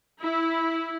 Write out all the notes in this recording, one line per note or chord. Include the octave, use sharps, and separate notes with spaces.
E4